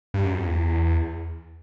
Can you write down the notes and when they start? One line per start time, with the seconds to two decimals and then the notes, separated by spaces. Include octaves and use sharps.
0.14 G2
0.25 F#2
0.35 F2
0.46 E2